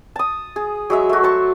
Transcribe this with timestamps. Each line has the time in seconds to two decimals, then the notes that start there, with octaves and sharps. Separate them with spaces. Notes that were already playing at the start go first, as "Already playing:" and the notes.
0.16 A5 D#6
0.56 G#4
0.90 F#3 G#3 E5
1.09 A3 F#4
1.23 C5 A5 C#6